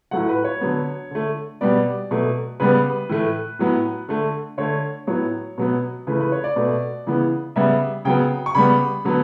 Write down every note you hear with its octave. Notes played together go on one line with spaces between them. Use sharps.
A2 F#3 A3 F#5
B4
C#5
D3 F#3 B3
D3 A3
B2 G3 B3 D5
B2 F#3 A3
C#3 G3 B3 B4
A2 E3 A3
A2 F#3 B3
D3 A3
D3 A3 C#5
A2 F#3 B3 C#5
B2 F#3 B3
C#3 E3 A3 B4
B4
C#5
D5
B2 A3
C#3 E3 B3
C#3 G3 B3 E5
C#3 F#3 B3 G5
C#6
C#3 G3 B3 B5
D3 F#3 B3